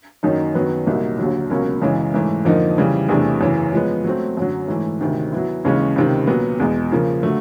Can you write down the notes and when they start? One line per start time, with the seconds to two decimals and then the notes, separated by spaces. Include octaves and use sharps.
0.23 F#2 D#3 F#3 A#3 D#4
0.55 F#2 D#3 F#3 B3
0.86 C2 A#2 F#3 A#3 D#4
1.18 D#2 D3 F#3
1.50 C#2 B2 F#3 A#3 C#4
1.82 F#2 C#3 E3 G#3
2.14 G#2 E3 A3
2.45 F2 D3 F3 A#3 D#4
2.78 C#3 E3 G3
3.09 E2 C3 E3 A3 D4
3.41 F#2 C#3 E3
3.73 F3 G#3 B3
4.04 F#3 A3 C4
4.37 F#2 D3 F#3
4.68 G#2 E3 A3
5.01 D2 C3 D#3
5.33 F#3 B3 E4
5.64 D#2 C#3 E3 G#3 C#4
5.96 C#2 C3 D#3
6.27 A#2 F#3 B3
6.59 E2 B2 G#3
6.91 C#3 F3 A#3
7.23 D3 F#3 A3